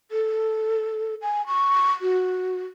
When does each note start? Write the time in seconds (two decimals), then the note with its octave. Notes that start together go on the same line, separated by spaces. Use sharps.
0.11 A4
1.22 G#5
1.47 C#6
2.01 F#4